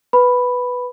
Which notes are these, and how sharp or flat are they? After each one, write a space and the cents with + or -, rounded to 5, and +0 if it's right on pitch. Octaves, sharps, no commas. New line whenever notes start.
B4 +0 B5 +0